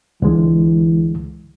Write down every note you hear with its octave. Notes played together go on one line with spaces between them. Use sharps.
C#2 D3 E3 G#3